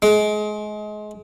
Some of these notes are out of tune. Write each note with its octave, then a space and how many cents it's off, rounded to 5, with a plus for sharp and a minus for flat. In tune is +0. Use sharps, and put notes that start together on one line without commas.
G#3 +30